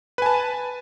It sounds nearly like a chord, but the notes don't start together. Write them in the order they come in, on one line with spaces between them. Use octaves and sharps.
B4 G#5 A5